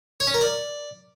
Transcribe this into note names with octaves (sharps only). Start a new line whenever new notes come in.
C#5
C#4
A#4
D5